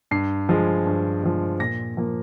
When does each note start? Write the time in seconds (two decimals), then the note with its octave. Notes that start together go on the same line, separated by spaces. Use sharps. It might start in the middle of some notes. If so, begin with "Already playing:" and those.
0.11 G2 C7
0.49 F3 G#3
0.86 G2
1.23 F3 G#3
1.60 A#2 A#6
1.97 F3 A#3